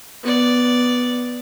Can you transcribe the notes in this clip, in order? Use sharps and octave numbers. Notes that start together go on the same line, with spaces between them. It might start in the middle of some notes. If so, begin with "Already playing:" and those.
B3 D5